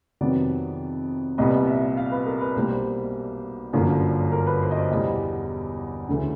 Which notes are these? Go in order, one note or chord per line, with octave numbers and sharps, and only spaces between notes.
F2 C3 D#3 F#3 B3 D5
C2 A#2 G3 B3 D#5
E5
F5
B4
A#4
B4
B1 B2 G3 A#3 C5
G1 F#2 D3 F3 A#3
A#4
B4
C5
D#5
D5
E2 B2 G3 D#5
D2 C#3 E3 A3